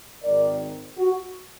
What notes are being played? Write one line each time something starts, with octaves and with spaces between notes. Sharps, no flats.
G#1 G#2 D#3 A#4 D5
F#4